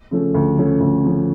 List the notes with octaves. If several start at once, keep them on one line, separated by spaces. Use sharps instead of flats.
C#3 F3 A3 C#4
D2
C#3 F3 A3 C#4
D2
C#3 F3 A3 C#4